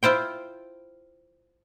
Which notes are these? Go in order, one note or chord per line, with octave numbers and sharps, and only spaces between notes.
E4 F4 C5 G5